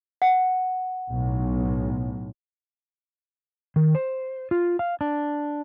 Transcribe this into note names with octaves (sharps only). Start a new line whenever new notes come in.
F#5
B1 A2
D#3
C5
F4
F5
D4